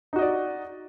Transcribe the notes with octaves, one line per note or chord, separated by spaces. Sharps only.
D#4 F#4 D5 D#5